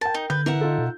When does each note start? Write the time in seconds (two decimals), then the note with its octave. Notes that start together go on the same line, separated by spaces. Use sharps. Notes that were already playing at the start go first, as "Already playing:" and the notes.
0.01 A#4 G5 A5
0.14 D#4
0.30 D3 B4 G6
0.46 E3 A#4 E5 F#5
0.61 D#4 F4 A4
0.78 B2